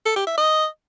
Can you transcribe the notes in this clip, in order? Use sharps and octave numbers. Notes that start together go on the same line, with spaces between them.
A4
G4
E5
D#5